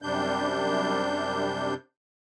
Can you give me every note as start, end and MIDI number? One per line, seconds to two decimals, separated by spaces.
0.02 1.74 42
0.02 1.74 48
0.02 1.74 55
0.02 1.74 62
0.02 1.74 91